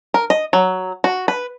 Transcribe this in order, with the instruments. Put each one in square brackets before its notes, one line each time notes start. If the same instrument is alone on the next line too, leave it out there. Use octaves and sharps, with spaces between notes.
[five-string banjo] A#4
D#5
F#3
F#4
B4